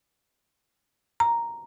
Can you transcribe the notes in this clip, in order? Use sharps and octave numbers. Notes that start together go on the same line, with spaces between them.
A#5